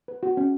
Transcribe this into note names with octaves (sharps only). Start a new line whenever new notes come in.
B4
F#4
C#4